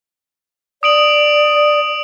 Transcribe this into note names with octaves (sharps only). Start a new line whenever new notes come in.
D5 D#6 D7 F#7